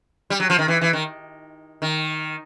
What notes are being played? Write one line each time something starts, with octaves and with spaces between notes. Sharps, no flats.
G3
F#3
F3
D#3
E3
E3
D#3
D#3